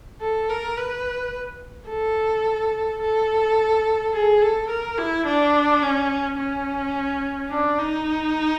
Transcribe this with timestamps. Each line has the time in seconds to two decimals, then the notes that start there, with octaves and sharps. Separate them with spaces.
0.21 A4
0.49 A#4
0.77 B4
1.89 A4
3.01 A4
4.13 G#4
4.41 A4
4.69 A#4
4.98 E4
5.26 D4
5.82 C#4
6.37 C#4
7.50 D4
7.78 D#4